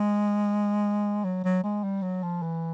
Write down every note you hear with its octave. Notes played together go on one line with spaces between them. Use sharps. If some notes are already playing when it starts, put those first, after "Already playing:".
Already playing: G#3
F#3
F#3
G#3
G3
F#3
F3
E3